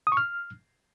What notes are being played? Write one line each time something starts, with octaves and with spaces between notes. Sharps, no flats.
D#6
C#6
F6